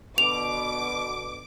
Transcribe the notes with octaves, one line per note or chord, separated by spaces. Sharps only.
B2 D3 D6 F7